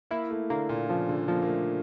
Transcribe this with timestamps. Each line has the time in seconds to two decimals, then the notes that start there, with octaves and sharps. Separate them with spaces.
0.11 A#3 E4
0.31 A3
0.50 D3 A#3
0.69 A#2
0.89 C#3 F3
1.09 D3
1.28 F3 A#3
1.42 A#3
1.48 A3